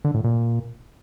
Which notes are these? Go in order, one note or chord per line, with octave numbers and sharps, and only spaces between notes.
D3
A2
A#2